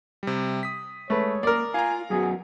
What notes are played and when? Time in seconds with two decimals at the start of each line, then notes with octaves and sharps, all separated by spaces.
0.23 C3 G3
0.63 D#6 B6
1.10 G#3 A3 B4 C#5
1.43 A#3 A#4 D5
1.74 F4 F5 G#5 A#5
2.10 F#2 B3 F#4 G#4